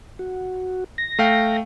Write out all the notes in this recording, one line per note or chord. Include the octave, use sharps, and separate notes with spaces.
F#4
A#6
A3 F5 G5